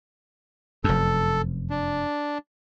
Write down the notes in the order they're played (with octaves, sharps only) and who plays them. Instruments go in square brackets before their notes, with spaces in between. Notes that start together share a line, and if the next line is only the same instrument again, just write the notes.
[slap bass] F1 F#2 [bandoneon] A4
[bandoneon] D4